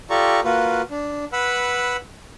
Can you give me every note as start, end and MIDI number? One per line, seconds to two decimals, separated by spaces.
0.10 0.40 65
0.10 0.40 67
0.10 0.40 69
0.10 0.40 74
0.10 0.40 82
0.10 0.40 85
0.44 0.82 58
0.44 0.82 65
0.44 0.82 66
0.44 0.82 71
0.90 1.25 62
1.33 1.97 71
1.33 1.97 78
1.33 1.97 83
1.33 1.97 88